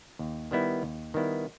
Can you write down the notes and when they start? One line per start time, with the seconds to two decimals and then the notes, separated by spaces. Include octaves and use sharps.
0.19 D#2
0.51 D#3 G3 B3 E4
0.83 D#2
1.14 D#3 G3 B3 E4